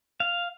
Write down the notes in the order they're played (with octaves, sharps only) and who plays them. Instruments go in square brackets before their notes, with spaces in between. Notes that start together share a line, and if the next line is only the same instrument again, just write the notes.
[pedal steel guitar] F5